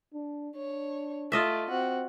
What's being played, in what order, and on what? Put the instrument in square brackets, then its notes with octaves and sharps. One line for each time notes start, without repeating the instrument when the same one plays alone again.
[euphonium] D4
[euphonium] D4 [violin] C#5
[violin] A3 [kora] F4 D#5 E5
[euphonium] C4 [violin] F#4